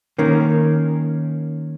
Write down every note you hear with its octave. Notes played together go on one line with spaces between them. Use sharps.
D#3 A#3 C#4